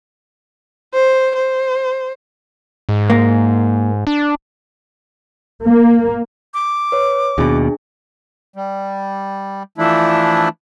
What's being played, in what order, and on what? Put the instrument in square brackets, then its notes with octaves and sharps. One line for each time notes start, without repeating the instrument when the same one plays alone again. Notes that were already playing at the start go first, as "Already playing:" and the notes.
[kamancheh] C5
C5
[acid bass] G#2
[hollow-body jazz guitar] A#3
[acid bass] D4
[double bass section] A#3
[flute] D6
[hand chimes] B4 C#5
[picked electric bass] D#2 B2 [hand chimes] D4 E4 G#4
[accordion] G3
E3 F3 A3 D4 E4